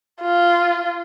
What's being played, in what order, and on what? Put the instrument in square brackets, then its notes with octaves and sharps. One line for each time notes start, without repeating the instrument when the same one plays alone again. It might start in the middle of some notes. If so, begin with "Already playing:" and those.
[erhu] F4